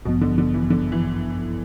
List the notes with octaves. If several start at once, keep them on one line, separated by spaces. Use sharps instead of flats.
A1 G2 B2 F3 B3
D3
D3
E3
D3
E3